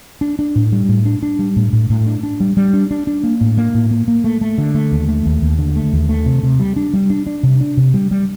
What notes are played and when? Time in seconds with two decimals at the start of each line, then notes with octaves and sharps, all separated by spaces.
0.21 D4
0.39 D4
0.56 A2
0.72 G3
0.89 A2
1.06 D4
1.23 D4
1.39 G3
1.56 A2
1.73 A2
1.90 A2
2.06 D4
2.23 D4
2.40 G3
2.57 G3
2.74 D4
2.91 D4
3.07 D4
3.24 A#3
3.41 A2
3.57 A#3
3.74 A2
3.91 A#3
4.08 A#3
4.24 A3
4.41 A3
4.58 D3
4.75 A3
4.92 D#2
5.08 A3
5.26 D#2
5.42 D#2
5.59 D3
5.76 A3
5.93 D#2
6.09 A3
6.26 C3
6.43 C3
6.60 G3
6.76 D4
6.93 G3
7.10 D4
7.27 D4
7.43 C3
7.61 D4
7.77 C3
7.94 G3
8.11 G3